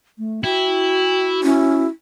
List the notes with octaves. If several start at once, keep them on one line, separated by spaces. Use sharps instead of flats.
A3
E4 F#4 G5
C#4 E4